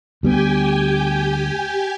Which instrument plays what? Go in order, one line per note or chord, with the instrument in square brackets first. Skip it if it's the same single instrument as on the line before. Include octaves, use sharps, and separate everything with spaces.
[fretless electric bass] D2 G3 B3 [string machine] G4 G5 G#5